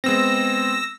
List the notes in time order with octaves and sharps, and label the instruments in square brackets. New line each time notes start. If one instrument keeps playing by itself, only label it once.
[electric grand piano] G#3 B3 C4 [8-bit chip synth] E6 A#6